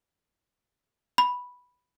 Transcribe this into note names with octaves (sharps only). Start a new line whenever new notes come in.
B5